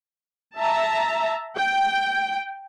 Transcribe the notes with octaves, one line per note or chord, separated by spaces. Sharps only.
E5 A5 A#5
G5